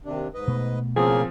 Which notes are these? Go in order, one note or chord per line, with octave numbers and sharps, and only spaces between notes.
D#2 C3 D4
G#2 B4 D#5
B2 A3
C#3 F3 A#3 C4 G#4 A#4